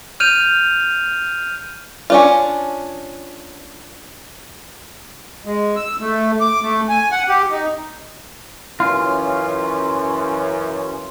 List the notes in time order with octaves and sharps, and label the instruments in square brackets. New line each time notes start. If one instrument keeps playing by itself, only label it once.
[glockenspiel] F6 G6 D#7 F7
[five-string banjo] C#4 D4 F4
[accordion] G#3
E6
A3
D6
A3
G#5
F#5
G4
D#4
[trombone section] F#2 E3 C#4 [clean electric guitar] F4